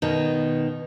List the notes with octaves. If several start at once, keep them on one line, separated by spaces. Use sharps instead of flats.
B2 D#3